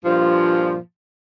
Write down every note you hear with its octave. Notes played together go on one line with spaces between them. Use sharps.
G2 A#2 F3